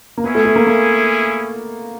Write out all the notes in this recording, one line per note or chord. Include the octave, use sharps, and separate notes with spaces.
A#3
B3 C#4 E4 G#4
A3
A3
A#3
A#3